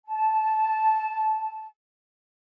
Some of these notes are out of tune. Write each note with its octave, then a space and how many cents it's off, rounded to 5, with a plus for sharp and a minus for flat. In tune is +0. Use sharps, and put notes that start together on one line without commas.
A5 -15